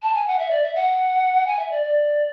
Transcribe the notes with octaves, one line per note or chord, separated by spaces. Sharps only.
A5
G#5
F#5
E5
D5
E5
F#5
G#5
E5
D5
D5